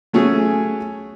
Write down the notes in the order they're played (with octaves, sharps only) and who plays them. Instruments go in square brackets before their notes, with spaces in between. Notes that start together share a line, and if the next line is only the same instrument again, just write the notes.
[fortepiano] F#3 A3 C#4 F#4 G#4